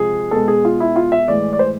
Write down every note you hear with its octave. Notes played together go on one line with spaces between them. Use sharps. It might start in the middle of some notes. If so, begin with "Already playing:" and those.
Already playing: C3 F3 G#3 G#4
B2 G#3 A4
G#4
F4
E4
F4
E5
A2 E3 G#3 D5
D5
C5